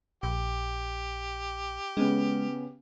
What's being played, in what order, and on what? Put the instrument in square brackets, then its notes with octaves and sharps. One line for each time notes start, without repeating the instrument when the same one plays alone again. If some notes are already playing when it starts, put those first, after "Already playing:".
[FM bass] A#1 [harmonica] G4
[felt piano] C#3 B3 C#4 [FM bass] G#3